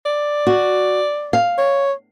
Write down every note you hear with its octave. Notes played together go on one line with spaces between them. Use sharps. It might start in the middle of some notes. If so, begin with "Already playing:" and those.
D5
F#4
F5
C#5